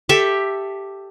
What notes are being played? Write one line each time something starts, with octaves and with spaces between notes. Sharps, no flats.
G4 A4 E5